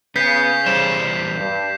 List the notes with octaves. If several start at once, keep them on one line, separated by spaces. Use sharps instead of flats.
C#3 B3 G6 B6 C7
E2 G3 C5 E7
G2